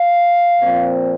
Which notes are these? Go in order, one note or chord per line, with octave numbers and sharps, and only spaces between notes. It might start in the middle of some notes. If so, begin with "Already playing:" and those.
Already playing: F5
A#2 F3 C4